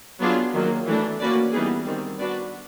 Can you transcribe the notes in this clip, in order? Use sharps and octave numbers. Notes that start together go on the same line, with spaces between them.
F#3 B3 D4 F4 G#4
D#3 F#3 A#3
E3 A3 D4
A#3 C#4 F#4 B4 D5
E3 G3 B3 D#4 G#4
D#3 G3 C4
B3 D4 F#4 B4 D5